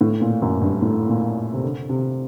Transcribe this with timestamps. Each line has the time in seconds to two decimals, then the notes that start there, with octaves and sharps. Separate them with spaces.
0.01 A2
0.21 A#2
0.42 F#2
0.62 G2
0.82 A2
1.09 A#2
1.53 C3
1.63 D3
1.89 C3